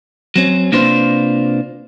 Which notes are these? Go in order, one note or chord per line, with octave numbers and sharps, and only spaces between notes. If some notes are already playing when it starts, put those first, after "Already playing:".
F#3 C4 C#4
C3 A#3 D4 F4 B4 C5